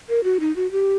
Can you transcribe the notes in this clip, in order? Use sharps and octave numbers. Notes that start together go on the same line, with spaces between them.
A#4
F#4
D#4
F#4
G4